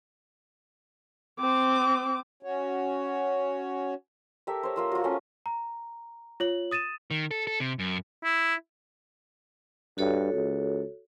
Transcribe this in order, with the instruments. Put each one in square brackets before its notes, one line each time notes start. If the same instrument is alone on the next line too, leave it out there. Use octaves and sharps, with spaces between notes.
[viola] C4 D6
[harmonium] C#4 F#4 C#5
[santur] G4 A4 A#4 E5
C5 C#5
A#3 F4 E6
F4 F#4
A3 C#4
[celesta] A#5
F4 C#5 F#7
D#6 A6 D#7 E7
[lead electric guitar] D#3
A4
A4
C3
F#2
[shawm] E4
[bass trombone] G2 [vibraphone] F#4 A4 C#5
[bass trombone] C#2